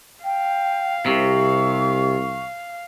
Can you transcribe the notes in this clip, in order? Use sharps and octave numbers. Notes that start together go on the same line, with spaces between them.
F5 G5
C2 C3 C#6